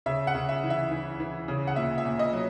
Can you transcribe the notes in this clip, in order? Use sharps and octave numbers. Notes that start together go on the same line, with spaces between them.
C#3 E5
F#5
C#3
E5
E3
E5
E3
E3
C#3
F#5
A#2 E5
E5
A#2
D#5
F#3